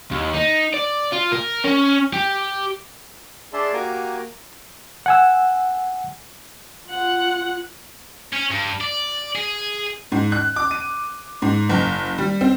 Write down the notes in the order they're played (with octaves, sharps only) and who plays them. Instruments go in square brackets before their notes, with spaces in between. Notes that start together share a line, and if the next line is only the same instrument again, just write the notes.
[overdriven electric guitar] D#2
D#4
D5
F4
A#4
C#4
G4
[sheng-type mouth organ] D4 G#4 D5 E5 A5 C6
A#3 F#4 G4 G#5 A#5 D6
[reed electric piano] F#5 G#5 E6
[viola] F4 F#5
[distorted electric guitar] C#4
G2
D5
G#4
[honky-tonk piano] G#2
F#6
D6
D#7
G#2
F#1
G3
C4